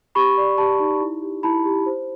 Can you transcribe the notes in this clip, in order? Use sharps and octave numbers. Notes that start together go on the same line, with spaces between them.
G4 B5 C#6
D5
G4 A5 B5
D#4
E4
G4
E4 A5 B5
G4
C5